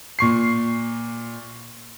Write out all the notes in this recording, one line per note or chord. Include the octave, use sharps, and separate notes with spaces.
A#2 C#6 C7